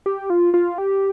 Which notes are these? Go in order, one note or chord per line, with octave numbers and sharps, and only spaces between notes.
G4
F4
F4
G4